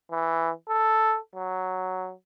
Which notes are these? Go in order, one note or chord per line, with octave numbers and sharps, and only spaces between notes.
E3
A4
F#3